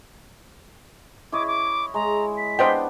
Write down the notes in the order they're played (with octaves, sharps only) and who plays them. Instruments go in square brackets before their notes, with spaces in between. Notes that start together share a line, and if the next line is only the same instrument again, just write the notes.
[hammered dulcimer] E4 C#5 D#5 [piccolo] D6
[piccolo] D6
[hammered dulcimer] G#3 [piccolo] A#5
[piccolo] B6
[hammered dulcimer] B3 D4 [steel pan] C5 D#5 G5